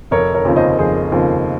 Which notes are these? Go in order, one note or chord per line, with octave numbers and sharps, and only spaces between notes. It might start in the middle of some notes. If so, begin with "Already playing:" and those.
F1 A#4 C#5
A#4 C#5
D#2 C#3 F3 C4
C5 D#5
F1 G#4 C5
D#2 C#3 F3 C4